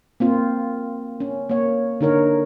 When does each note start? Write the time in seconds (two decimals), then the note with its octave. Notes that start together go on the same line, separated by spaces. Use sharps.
0.20 A#3 C4 F4
1.20 C#4
1.49 A#3 C#5
2.01 D3 D#4 A#4 C#5